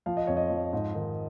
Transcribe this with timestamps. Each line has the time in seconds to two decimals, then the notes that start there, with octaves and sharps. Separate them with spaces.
0.06 F3 F5
0.17 D#5
0.27 F2 C#5
0.37 D#5
0.50 F3
0.73 G#2
0.95 D#3